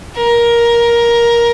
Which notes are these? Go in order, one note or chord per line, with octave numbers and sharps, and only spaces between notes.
A#4